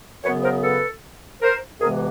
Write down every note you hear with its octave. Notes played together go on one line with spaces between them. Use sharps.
F#2 C#3 F#3 B3 B4 C#5
A#4 C5
A4 B4
A#4 C5
D2 C3 E3 G#3 B3 G#4 A#4